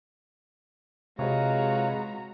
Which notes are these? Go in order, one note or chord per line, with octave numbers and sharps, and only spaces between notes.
C3 G#3 F4 F#4 B4 C#5 A#5